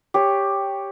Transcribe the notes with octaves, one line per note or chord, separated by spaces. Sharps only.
G4 C#5